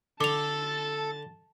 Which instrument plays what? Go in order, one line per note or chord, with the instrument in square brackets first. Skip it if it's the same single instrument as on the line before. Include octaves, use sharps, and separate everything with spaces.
[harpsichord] D3 [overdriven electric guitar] A4 [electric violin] A5 A6 [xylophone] D6 F7